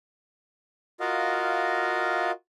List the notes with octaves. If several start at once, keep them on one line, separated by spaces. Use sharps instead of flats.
F4 F#4 A#4 D#5 F5